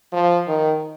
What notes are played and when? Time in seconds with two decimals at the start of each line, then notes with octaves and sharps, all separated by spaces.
0.13 F3
0.48 D#3